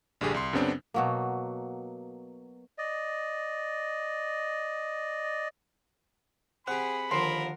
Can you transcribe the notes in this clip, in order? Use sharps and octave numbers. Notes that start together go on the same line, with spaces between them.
A#1 G2 D3 G4 G#4
C2 C6
F#2 C#3 B3 C4 D4
B2 F#3 A#3
D5 D#5
C4 G4 G#4 F#5 B5
D#2 D3 F3 A#4 C6